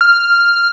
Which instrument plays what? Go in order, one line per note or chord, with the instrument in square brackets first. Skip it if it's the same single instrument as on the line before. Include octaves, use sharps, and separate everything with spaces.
[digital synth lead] F6